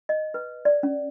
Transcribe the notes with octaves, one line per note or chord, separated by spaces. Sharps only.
D#5
B4
D5
C#4